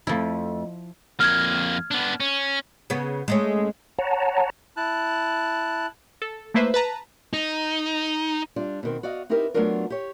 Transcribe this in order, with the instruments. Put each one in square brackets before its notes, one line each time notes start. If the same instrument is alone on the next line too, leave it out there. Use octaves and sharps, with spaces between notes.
[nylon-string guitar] F2 A3 [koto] F3 E4
[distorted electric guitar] F2 A#3 [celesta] F6 G#6
[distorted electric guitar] B3 D4
C#4
[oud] C#3 B3
G#3 A3 C#4
[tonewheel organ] C#5 F#5 A5 A#5
[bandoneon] E4 A5 F#6
[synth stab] A4
A3 A#3 E4 B4 C5 E5
B4 A5 A#5
[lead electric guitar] D#4
[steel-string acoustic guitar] G3 D4 F4
B2 D#3 C4
F#4 D5 D#5 F5
C4 D#4 E4 G4 A#4 B4
F#3 A3 B3 D4 F4 A#4
G4 C#5